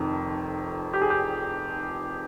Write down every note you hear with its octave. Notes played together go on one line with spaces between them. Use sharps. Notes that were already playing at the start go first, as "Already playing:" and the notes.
Already playing: F1 F2 D#3
G4
G#4
G4